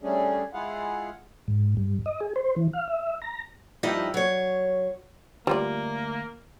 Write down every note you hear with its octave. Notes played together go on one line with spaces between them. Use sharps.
G3 A3 C#4 D4 G#4
G#3 E4 F4 G#4 F5 F#5
G#2
G2
D#5
G#4
C5
E3
F5
E5
A#5
G2 F3 D#4 E4 G4 D#5
F#3 C#5
D2 G3 A#3 F4 D5